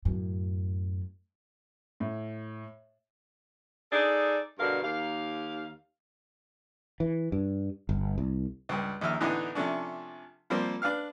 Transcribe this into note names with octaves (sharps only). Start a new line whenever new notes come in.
F#2 A2
A2
D#4 G#4 A4 D5
G2 B2 D3 A#4 F5
D#2 A#3 F5
E3
G2
G1
C2
C#2 G2
A#1 D#2 E5 F6
A2 D3 E3 B3 D#4
C3 F3 A3 C#4 D4
F3 G3 A#3 C4
D4 B4 F5 F6